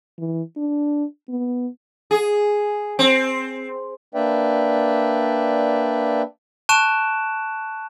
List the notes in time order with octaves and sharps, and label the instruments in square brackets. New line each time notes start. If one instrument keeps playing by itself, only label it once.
[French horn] E3
D4
B3
[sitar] G#4
C4
[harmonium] A#3 D4 B4 D5 E5 G5
[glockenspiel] A5 C#6 F#6 D7 E7